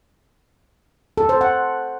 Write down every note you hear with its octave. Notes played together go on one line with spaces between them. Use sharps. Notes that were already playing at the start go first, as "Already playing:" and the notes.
A4
C5
F#5